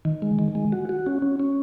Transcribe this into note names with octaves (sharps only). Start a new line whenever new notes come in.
D#3
G#3
D#3
G#3
F#4
F#4
C#4
C#4
C#4